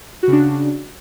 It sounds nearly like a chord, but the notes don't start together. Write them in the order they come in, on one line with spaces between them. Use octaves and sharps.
F#4 C#3 D4